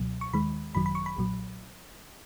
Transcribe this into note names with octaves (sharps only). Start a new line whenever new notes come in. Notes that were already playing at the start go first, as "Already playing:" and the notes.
Already playing: C#2 B2 F#3
C#6
D#2 D#3 G#3 B5
G#1 F#2 D#3 F#3 B5
B5
C#6
B5
B1 A#2 F#3